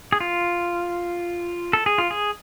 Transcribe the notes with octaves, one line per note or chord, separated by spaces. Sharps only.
G#4
F4
A4
G#4
F4
G#4